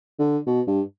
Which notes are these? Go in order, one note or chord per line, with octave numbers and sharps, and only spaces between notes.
D3
B2
G2